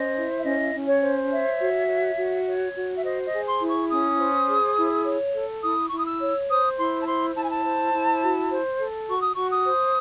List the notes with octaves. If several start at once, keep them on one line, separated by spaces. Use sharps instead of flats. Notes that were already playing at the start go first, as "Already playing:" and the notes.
Already playing: C#4 C5 D#5
E4
E5
C#4 D#5
C#4
C#5
C5
C#5 E5
F#4
C#5
F#4
C#5
F#4
E5
C5 D#5
D#5
G#4
C6
E4
C#6
C#4 D#6
C5
G#4
E4
C#5
A4
E4 D#6
C#6
E4
D#6
E6
C#5
C5 D#6
E4 C6
A5
C5 C6
E4 A5
G#5
A5
C5
E4
F#4
C5
A4
F#4 C#6
D#6
F#4 C#6
D#6
C5